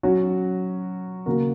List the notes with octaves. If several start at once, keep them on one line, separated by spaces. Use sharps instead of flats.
F#3 C#4 F#4
C#3 A#3 F#4 A#4